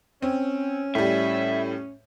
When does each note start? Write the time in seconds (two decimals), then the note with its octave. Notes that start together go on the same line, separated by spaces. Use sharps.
0.22 C4 C#4
0.95 A2 G3 E5